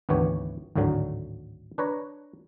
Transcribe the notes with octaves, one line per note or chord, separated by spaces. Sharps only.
G#1 D2 E3 B3 G4 C#5
G#1 D2 A2 D3 F#3
D4 B4 C#5 A#5